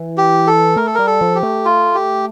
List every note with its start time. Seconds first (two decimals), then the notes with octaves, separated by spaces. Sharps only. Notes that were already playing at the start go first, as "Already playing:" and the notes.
Already playing: E3
0.18 G4
0.47 A4
0.76 A3 A#4
0.86 A4
0.95 G3 A#4
1.07 A4
1.21 F3
1.35 G4
1.43 A3
1.65 F4
1.94 G4